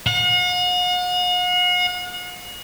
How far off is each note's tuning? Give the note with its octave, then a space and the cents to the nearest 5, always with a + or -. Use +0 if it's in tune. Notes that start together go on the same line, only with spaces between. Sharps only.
F#5 -45